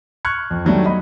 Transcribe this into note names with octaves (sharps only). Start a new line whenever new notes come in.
C#6 F6 F#6 G#6 C#7
F2
D#3 F#3 G3 A3
D#5 B5